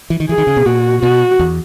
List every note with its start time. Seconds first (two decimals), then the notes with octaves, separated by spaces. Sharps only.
0.10 E3
0.20 D#3
0.29 E3 G#4
0.38 D#3
0.47 C#3
0.56 B2
0.65 A#2 F#4
1.02 B2 F#4
1.39 E2